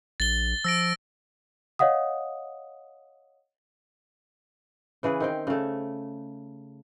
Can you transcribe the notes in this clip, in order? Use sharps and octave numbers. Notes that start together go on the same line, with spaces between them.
A#1 A6 G7
F3 E6 A#6 D7
C#5 D#5 F5 F#5 D#6
C#3 E3 G#4 B4
D#3 C4 G5
C#3 A3